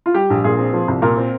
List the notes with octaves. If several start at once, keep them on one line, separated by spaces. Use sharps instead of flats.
F4
G3 G4
A#1
A#2 G#4
C4
F3
C2
A#2 A#4
C4